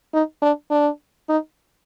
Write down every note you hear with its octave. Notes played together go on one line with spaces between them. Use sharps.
D#4
D4
D4
D#4